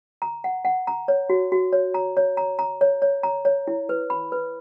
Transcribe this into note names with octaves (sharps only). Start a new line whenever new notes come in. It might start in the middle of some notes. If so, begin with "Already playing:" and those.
A#5
F#5
F#5
A#5
C#5
F#4
F#4
C#5
A#5
C#5
A#5
A#5
C#5
C#5
A#5
C#5
E4
B4
B5
B4